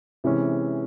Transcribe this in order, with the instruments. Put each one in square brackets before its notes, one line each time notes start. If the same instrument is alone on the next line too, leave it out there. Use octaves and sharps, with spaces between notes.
[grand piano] C3 E3 G#3 C#4